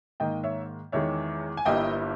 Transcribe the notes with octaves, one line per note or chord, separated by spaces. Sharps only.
G#2 D#3 A#3 D#5 G5
C#5 E5
E2 D#3 G#3 C#5 E5
G#5
G1 G2 G3 A#3 E4 D#5 G5